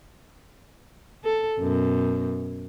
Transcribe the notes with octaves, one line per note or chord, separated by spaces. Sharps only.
A4
F#2 B2